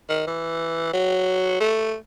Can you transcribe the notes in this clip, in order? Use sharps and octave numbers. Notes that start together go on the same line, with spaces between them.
D#3
E3
F#3
A3